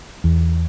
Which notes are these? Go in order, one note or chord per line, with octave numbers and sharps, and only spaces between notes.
E2